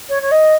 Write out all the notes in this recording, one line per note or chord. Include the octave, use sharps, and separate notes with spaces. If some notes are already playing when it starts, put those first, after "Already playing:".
C#5
C#5
D#5